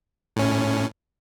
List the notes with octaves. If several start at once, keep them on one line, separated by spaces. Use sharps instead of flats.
A2 C#4